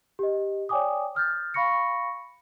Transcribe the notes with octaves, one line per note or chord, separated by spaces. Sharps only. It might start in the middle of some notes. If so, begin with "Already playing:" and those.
G4 D#5
C#5 D5 G5 G#5 D6 D#6
D#6 F6 G6 A6
F5 B5 C#6 A#6 C#7